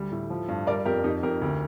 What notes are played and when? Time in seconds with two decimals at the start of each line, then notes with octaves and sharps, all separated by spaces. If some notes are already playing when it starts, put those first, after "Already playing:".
Already playing: D2 G3
0.12 A2
0.30 F3
0.48 G2
0.67 G3 A#4 D5
0.85 F2 G4 A#4
1.04 F2 D#4 G4
1.23 F2 G4 A#4
1.42 D2